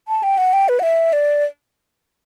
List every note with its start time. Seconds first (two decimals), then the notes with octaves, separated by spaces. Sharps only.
0.08 A5
0.23 G5
0.38 F#5
0.53 G5
0.69 B4
0.79 F#5
0.83 E5
1.13 D5